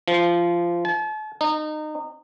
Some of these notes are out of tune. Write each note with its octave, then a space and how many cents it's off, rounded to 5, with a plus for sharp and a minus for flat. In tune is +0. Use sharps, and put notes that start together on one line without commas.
F3 -15
A5 -40
D#4 -25